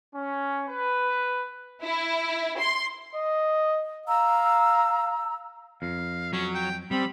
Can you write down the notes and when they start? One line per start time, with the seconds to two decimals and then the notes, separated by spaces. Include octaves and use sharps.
0.14 C#4
0.68 B4
1.82 E4
2.59 C6
3.15 D#5
4.08 F5 A#5 E6
5.82 F2 F5
6.33 F#3 C#4
6.55 G5
6.91 G3 C4 B5